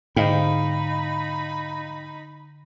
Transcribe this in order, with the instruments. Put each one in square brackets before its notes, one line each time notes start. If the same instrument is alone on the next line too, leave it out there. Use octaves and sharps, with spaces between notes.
[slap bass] G#2 [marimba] D3 [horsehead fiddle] D#4 B5 [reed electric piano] D#5 F5 G5